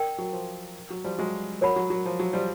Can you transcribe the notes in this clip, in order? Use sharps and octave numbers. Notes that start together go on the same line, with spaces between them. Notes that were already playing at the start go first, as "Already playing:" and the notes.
Already playing: A#4 D5 G5
F#3
F3
F#3
F3 G3
F#3 G#3
F#3 A#4 C#5 F#5 B5
F#3
F#3
F3
F#3
F3 G3